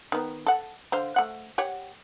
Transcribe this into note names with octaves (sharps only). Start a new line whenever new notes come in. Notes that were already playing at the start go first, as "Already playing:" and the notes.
D#3 B3
A4 F#5
D3 C5 F5
A3 F#5
G4 C#5 F#5